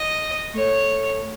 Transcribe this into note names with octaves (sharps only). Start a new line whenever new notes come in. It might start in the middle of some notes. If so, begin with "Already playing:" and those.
Already playing: D#5
A3 C#5